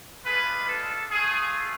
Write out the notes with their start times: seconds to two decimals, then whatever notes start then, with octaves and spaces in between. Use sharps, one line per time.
0.24 G#3 D4 F4 G#4 B4
0.66 A4
1.09 A3 F4 G#4